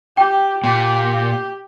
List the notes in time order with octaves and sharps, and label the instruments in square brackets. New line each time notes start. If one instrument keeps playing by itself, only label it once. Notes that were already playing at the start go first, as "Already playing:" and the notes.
[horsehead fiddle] G4 [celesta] G5
[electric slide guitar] A#2 [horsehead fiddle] G4